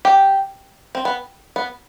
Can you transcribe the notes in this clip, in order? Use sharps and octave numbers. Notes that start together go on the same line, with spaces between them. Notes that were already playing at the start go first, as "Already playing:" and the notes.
G4
C4
B3
B3